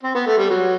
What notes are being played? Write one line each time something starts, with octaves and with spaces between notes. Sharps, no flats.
C4
B3
A3
G3
F#3